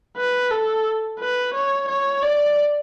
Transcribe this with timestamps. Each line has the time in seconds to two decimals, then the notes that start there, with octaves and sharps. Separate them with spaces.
0.17 B4
0.51 A4
1.20 B4
1.54 C#5
1.88 C#5
2.23 D5